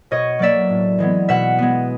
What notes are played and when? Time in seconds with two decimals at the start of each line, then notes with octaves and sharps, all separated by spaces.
0.11 B2 C#5 D#5
0.39 F#3 A#3 D5 E5
0.70 A2
0.98 E3 G#3 B3
1.29 B2 E5 F#5
1.58 G#3 B3